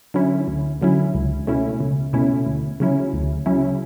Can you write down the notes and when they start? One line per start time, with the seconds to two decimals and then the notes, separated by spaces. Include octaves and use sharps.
0.14 D3 F#3 C#4 E4
0.48 D2
0.81 D3 F#3 C#4 E4
1.15 C#2
1.47 B2 A3 C#4 E4
1.80 C#2
2.13 B2 A3 C#4 E4
2.46 D2
2.80 C#3 F#3 C#4 E4
3.13 D2
3.46 C#3 F#3 C#4 E4